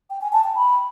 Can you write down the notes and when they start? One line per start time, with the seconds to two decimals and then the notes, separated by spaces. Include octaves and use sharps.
0.10 G5
0.21 G#5
0.33 A5
0.44 G5
0.55 B5